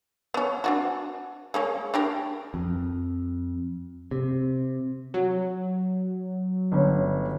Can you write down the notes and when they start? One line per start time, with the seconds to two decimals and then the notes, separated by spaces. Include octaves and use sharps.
0.34 B3 C#4
0.64 D4 F4 F#4
1.54 G#3 A#3 C#4
1.94 D4 G4 A#4
2.54 F2
4.11 C3
5.14 F#3
6.72 G1 C#4